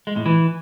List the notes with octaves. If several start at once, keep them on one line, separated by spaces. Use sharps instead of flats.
G#3
A2
E3